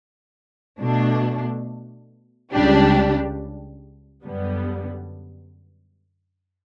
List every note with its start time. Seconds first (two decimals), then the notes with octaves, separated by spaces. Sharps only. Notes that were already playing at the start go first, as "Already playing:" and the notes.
0.80 B2 A3 D4
2.52 C#2 C#3 G3 D4 G4
4.24 F#2 D3 G3 B3